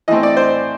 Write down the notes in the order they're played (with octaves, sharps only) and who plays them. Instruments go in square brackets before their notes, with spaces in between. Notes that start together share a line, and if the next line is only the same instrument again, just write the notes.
[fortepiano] E3 A3 C4 D#5
D5
C5